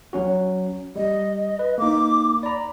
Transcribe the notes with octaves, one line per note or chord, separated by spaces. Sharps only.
F#3 C#4 F#4
G3 D#5
B4
A#3 D#4 D6
D5 A#5 B5